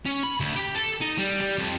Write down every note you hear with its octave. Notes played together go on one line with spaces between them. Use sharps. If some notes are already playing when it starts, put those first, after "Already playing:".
C#4
B5
D2
G4
A4
D#4
G3
G3
F2